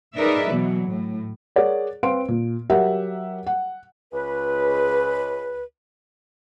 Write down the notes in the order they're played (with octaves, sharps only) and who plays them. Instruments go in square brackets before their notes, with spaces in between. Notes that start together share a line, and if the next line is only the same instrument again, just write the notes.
[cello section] D#4 G#4 A#4 B4 D5 E5
B2 E3 F#3
A2
[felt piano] G#4 A#4 C#5 D5 F#5
C4 B4 F5 C6 D7
A#2
F#3 G4 A#4 E5 F#5
F#5
[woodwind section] C#2 B4